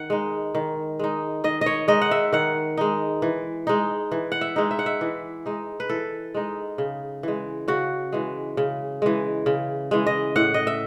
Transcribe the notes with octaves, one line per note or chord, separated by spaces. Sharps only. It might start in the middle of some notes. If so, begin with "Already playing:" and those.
Already playing: D#3 F#5
G#3 D#4
D#3
G#3 D#4
D#3 D#5
C#5 D#5
G#3 D#4 D#5
F#5
E5
D#3 F#5
G#3 D#4
E3
G#3 D#4
E3
F#5
E5
G#3 D#4
E5
F#5
E5
E3
G#3 D#4
B4
E3 A4
G#3 D#4
C#3
E3 G#3
C#3 F#4
E3 G#3
C#3
E3 G#3
C#3
E3 G#3
D#5
A2 F#5
D#5
E5